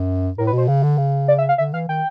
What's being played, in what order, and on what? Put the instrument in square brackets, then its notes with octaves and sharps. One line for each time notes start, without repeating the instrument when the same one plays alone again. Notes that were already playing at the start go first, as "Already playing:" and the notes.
Already playing: [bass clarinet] F#2
[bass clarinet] A2 [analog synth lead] A#4
[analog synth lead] B4
[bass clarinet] B2
[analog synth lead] C5
[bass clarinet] C#3
D3
C#3
[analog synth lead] D5
E5
F5
[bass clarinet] D3 [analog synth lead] E5
[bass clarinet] E3 [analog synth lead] F5
[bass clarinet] D#3 [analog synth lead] G5